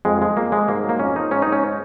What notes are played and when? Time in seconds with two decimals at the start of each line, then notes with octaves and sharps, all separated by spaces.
0.05 F2 G#3
0.22 F3 G#3
0.37 F2 A#3
0.52 F3 G#3
0.68 G#2 A#3
0.84 F#3
0.89 A#3
0.99 F2 C#4
1.16 F3 D#4
1.31 G#2 C#4
1.42 G#2 D#4
1.52 C#4